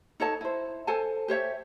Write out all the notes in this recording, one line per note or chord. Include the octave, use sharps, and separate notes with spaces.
D#4 A4 C#5 A5
E4 C5
A4 C5 G#5 A5
G4 C5 C#5 E5